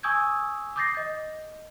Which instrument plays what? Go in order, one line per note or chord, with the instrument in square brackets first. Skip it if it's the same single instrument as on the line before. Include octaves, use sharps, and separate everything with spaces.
[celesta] G#5 C#6 D#6 E6 G6 G#6
D6 D#6 G6 A6 A#6 C7
D#5 G6